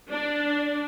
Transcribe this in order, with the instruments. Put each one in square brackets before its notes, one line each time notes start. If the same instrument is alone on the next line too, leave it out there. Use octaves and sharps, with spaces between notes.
[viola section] D4